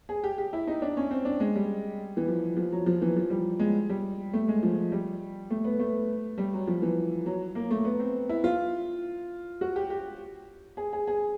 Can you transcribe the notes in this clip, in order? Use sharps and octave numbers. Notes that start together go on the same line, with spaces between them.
G#4
G4
G4
E4
D#4
D4
C#4
C4
D4
G#3
G3
E3
F3
F3
F#3
F3
E3
F3
G3
G#3
G3
A3
G#3
F3
G3
A3
B3
A3
G3
F#3
F3
E3
F#3
A#3
A3
B3
C4
E4
F4
F#4
G4
G4
G#4
G#4
G#4